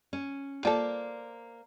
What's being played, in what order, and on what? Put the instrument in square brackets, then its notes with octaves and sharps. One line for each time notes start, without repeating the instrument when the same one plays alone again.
[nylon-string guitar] C#4
[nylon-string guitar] A#3 C5 D5 [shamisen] F4 A4